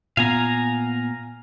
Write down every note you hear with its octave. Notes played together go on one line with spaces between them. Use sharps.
A#2 B3 F5 G#5 A#5